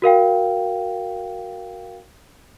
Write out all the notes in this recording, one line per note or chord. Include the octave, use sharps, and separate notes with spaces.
F#4 A#4 F5 G5